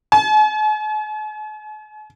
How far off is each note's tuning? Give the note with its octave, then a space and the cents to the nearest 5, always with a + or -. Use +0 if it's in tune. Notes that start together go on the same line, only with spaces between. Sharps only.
G#5 +45